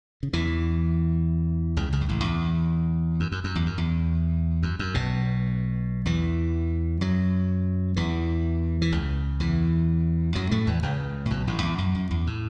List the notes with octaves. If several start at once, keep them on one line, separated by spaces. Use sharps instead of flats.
C#3
E2 E3
C#2 C#3
C#2 C#3
F#2
A1 A2
E2
F#2
F#2
F#2
E2
F#2
E2
F#2
F#2
B1 B2
E2 E3
F#2 F#3
E2 E3
E3
C#2 C#3
E2 E3
F#2 F#3
A2 A3
E2 E3
C#2 C#3
A2
B1 B2
A1 A2
E2
F#2
F#2
E2
A2